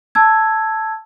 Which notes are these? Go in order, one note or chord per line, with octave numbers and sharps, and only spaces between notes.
A5 E6 G#6